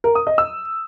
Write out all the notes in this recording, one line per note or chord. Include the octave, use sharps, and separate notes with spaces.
A#4
D#6
D#5
E6